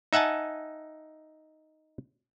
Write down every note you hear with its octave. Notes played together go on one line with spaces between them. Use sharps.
D#4 E5 F#5 G#5 A5